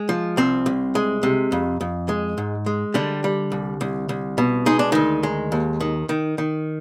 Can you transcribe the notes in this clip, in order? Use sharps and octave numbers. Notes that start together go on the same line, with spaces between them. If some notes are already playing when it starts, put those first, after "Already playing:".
Already playing: G#3
F3
C2 C4
C2
G#3
C3
F2
F2
G#3
G#2
G#3
D3 G3 D4
G3
C2
C2
C2
B2
G#3 D#4
D4
D2 D#3 D#4
G#3
D#2
D#3
D#3
D#3